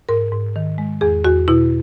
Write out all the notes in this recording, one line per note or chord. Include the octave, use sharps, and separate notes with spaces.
G#2 A#4
G#2
D#3
G#3
E2 G#4
E2 F#4
B2 E4